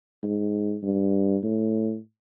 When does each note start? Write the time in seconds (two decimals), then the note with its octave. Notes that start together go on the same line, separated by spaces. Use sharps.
0.23 G#2
0.83 G2
1.43 A2